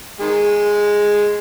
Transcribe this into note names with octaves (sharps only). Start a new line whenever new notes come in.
D#3 G#3